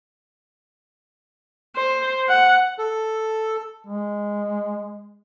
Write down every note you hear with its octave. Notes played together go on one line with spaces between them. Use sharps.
C5
F#5
A4
G#3